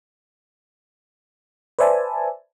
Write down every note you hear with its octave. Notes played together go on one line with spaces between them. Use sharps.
B4 C5 D5 E5 G#5 A5